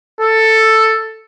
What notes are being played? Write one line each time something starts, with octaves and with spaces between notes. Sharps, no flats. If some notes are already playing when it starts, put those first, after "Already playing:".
A4